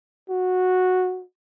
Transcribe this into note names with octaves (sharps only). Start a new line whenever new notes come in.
F#4